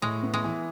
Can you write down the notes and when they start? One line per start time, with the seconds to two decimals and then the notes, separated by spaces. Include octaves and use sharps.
0.02 A2 G#3
0.23 B3
0.34 G#3
0.44 E3